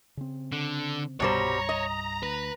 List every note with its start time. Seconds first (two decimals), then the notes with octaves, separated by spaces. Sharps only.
0.17 C#3 C4
0.52 D3
1.20 C2 G2 B2 G3 C5 C#5 A#5
1.69 D#5
2.23 D2 B4